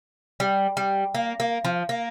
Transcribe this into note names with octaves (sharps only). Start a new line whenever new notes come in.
G3
G3
A#3
A#3
F3
A#3